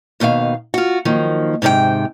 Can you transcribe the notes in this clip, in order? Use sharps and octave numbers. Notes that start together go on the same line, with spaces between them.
D#2 B2 D#3 A#4 F5
F4 F#4
D#3 F3 F#3 A#3
G#2 C3 D#3 A#4 G5